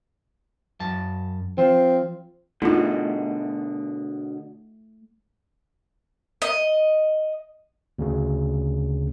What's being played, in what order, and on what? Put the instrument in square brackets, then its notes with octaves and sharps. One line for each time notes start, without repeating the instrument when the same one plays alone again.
[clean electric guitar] F#2 A5
[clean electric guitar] F3 [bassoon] C4
[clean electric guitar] B2 D3 [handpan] A3 [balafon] D#4 F4
[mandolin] D#5
[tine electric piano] D2 C#3